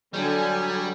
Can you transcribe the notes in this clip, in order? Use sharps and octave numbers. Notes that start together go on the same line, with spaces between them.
D3 F#3 G3 G#5